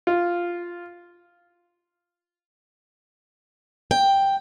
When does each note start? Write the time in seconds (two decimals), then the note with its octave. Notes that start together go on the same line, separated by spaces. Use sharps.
0.07 F4
3.91 G5